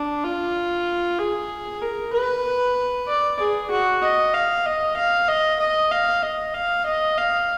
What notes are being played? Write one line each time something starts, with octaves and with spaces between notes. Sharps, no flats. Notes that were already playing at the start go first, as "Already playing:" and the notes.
Already playing: D4
F4
G#4
A#4
B4
D5
G#4
F#4
D#5
F5
D#5
F5
D#5
D#5
F5
D#5
F5
D#5
F5